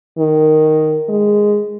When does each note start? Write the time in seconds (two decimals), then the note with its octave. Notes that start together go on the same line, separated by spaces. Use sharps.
0.19 D#3
1.09 G#3